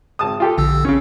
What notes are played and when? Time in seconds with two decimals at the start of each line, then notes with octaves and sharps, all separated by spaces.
0.19 G#1 A5 D#6
0.40 F4 G4 A4
0.58 A#1 D3 E6
0.85 C#3 C#4